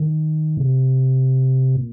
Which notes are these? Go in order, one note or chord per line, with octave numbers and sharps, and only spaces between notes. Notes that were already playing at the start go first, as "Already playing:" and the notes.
Already playing: D#3
C3
A#2